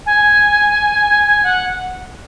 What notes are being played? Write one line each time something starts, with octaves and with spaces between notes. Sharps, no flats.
G#5
F#5